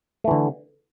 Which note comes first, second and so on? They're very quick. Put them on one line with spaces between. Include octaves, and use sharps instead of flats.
A3 E3 D3